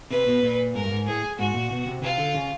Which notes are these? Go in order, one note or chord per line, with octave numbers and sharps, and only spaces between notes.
C3 B4
B2
A#2
G#2 A#4
G2
G#2
A2 G#4
G#2 F#4
A#2
B2
C3
C3 F4
D3
C#3